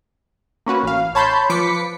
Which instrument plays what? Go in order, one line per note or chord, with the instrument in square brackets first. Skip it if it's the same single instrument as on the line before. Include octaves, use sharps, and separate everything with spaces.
[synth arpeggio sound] A#3 C#4 F#4 B4
A1 F5
C#5 A5 B5 C6 G6
F3 B4 D6 B6 C#7